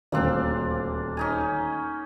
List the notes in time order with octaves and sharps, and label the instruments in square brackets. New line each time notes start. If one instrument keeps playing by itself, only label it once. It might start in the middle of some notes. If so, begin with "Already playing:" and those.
[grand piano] D#1 D2 [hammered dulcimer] A#3 C4 D4
[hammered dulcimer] C#4 D#4 G#5